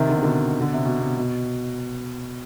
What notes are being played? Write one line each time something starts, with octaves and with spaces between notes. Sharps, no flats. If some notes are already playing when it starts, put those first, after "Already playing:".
Already playing: C3 D#3
D3
C3
B2 D3
D3
C3
B2
C3
B2